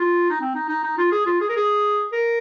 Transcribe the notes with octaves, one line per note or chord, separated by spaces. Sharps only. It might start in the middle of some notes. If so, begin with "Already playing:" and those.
Already playing: F4
D#4
C4
D#4
D#4
D#4
F4
G#4
F4
G#4
A#4
G#4
A#4